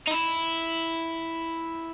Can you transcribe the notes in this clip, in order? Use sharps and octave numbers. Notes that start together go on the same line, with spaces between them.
D#4
E4